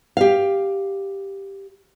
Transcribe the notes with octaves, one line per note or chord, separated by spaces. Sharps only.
G4 F5